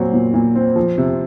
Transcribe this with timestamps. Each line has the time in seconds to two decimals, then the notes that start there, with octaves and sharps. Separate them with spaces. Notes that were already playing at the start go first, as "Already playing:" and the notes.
Already playing: A#2 F#3 C4
0.13 A#2
0.34 A#2
0.55 C4
0.76 F3
0.98 C3